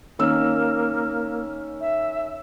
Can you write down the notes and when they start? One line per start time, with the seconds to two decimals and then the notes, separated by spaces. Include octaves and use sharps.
0.19 D#3 A#3 C#4 E6
1.81 E5